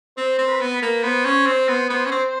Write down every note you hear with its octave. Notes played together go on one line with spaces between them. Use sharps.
C4 C5
C4
B4
B3
B4
A#3
B3 C5
C#4
C4
B3
B3
C#4
C4